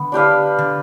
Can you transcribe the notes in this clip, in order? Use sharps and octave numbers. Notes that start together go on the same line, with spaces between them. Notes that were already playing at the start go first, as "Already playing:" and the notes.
Already playing: D3 B3
D4 G4 B4 F5
D3